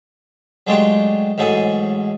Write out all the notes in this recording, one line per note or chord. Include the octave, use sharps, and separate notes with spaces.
F#3 G#3 A3 D4 F4 G4
A1 G#2 F#3 G#4 A4 G#5